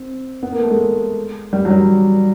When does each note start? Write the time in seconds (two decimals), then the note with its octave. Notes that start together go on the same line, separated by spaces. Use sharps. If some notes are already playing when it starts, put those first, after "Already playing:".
Already playing: C4
0.43 B3
0.52 A#3
0.61 A3
0.70 G#3
1.53 G3
1.65 F#3
1.71 G3